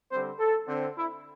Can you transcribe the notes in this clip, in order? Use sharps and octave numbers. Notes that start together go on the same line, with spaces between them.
D3 G3 C4 C5
A4
D3 C4
E4